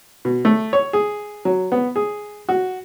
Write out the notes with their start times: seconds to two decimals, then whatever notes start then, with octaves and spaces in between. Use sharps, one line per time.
0.25 B2
0.45 A3
0.73 C#5
0.93 G#4
1.45 F#3
1.72 B3
1.96 G#4
2.49 F#4